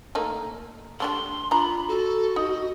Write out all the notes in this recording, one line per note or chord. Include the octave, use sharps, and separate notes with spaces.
A3 A#3 D#4
A3 D4 G4 C6
D4 F4 A#5 B5
F#4 A4
D#4 D#5